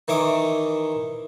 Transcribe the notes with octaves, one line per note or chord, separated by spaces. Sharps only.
D#3 E3 C#5 E5 D6 D#6